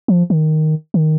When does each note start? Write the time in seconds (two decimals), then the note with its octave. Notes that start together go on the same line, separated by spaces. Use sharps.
0.08 F3
0.30 D#3
0.94 D#3